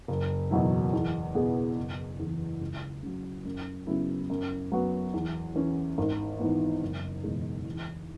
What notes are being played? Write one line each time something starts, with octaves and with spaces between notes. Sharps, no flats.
F#1
E2 B2 F#3 E4
E2
B2 B3 G#4
F#1
E2 E3
C#2
C#3 F#3
F#2
C#3 F#3 B3 E4
F#2
F#3 B3 F#4 B4
E2
E3 C#4
G#1
G#2 E3 B3
F#1
E2 B2 G#3
E2